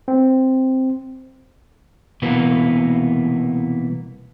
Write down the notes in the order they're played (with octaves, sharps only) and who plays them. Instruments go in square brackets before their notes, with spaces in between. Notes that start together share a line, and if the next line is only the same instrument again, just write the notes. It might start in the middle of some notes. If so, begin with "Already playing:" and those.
[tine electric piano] C4
[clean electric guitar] C2 B2 E3 A#3 B3